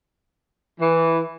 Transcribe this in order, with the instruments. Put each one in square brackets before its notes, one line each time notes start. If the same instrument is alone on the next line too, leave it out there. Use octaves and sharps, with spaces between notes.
[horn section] E3